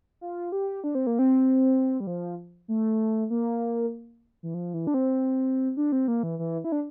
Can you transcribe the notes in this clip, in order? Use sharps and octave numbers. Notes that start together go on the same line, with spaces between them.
F4
G4
D4
C4
A#3
C4
G3
F3
A3
A#3
E3
F3
E3
D4
C4
D4
C4
A#3
E3
E3
E4
D4